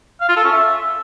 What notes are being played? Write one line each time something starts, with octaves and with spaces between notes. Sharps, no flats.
F5
F4
A4
C#4
E5